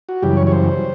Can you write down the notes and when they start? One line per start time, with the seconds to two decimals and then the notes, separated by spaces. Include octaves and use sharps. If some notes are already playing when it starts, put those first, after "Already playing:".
0.09 F#4
0.22 F#2 C#3 E3 G3 G4
0.37 C#5
0.47 C#5
0.52 C5